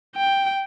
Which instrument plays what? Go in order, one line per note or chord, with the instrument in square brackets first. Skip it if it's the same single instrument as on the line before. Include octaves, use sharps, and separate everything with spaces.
[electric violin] G5